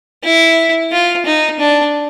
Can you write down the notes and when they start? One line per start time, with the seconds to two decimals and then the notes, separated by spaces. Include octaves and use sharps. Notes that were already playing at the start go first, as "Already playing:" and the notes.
0.24 E4
0.92 F4
1.26 D#4
1.60 D4